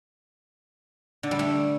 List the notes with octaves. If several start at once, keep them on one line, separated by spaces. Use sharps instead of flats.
D3
G3
A3